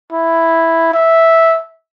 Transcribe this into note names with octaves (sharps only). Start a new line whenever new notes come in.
E4
E5